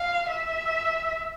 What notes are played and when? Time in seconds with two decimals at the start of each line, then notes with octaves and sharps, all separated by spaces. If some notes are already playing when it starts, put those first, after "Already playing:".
Already playing: F5
0.30 E5